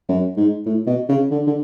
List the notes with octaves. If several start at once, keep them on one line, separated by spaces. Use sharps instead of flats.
F#2
G#2
A2
B2
C#3
D3
D3